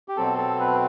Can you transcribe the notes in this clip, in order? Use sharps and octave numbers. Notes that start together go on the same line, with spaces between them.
G4
B2 F#3 C4 A4
A4
B4